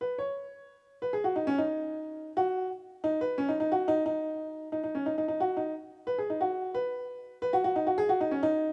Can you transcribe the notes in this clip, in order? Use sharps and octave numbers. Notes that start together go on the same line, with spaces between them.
B4
C#5
B4
G#4
F#4
D#4
C#4
D#4
F#4
D#4
B4
C#4
D#4
D#4
F#4
D#4
D#4
D#4
D#4
C#4
D#4
D#4
D#4
F#4
D#4
B4
G#4
D#4
F#4
B4
B4
F#4
F#4
D#4
F#4
G#4
F#4
D#4
C#4
D#4